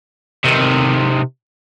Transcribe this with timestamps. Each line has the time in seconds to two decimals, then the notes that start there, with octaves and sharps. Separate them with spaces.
0.44 C3 D#3